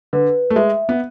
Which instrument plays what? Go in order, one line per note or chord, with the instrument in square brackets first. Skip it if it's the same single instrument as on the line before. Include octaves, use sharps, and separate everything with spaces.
[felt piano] D3 [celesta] B4
[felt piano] A3
[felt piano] G#3 [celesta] E5
[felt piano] B3